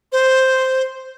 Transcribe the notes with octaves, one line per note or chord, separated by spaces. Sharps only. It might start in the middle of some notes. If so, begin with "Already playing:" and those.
C5